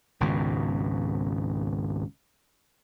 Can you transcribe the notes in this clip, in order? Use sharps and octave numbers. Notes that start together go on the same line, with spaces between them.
G#1 C#2 G#2 B2